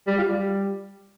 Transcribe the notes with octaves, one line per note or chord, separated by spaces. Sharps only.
G3
F4
G3